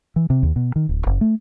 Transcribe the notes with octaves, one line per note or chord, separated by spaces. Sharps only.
E3
C3
D#2
B2
D#3
D1
F#1
A3